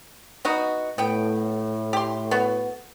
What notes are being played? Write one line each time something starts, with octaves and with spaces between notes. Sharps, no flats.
B3 D#4 F#4
A2 B3 G5
G4 C6
B3 F#4